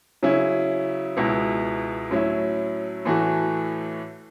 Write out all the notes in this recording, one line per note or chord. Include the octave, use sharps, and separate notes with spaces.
C#3 F#3 C#4 E4
C#2 B2 B3 E4
A2 F#3 C#4 E4
A2 E3 A3 F#4